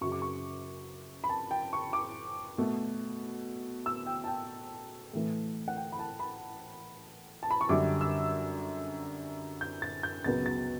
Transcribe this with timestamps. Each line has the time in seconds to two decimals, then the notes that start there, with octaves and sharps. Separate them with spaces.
0.01 F#2 C#3 F#3 C#6
0.12 D6
0.22 C#6
1.24 B5
1.29 A5
1.51 G5
1.73 C#6
1.93 D6
2.58 B2 A3
3.86 E6
4.06 G5
4.24 A5
4.27 G5
5.14 A2 E3 A3
5.68 F#5
5.77 G5
5.92 B5
5.99 A5
6.19 B5
7.43 A5
7.51 B5
7.61 C#6
7.69 F#2 D3 G3 D6
8.01 E6
9.61 G6
9.82 A6
10.03 G6
10.24 C#2 B2 F#3 B3 A6
10.46 A6